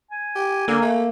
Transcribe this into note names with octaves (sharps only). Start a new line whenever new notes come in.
G#5
G4
D3 A#3
A3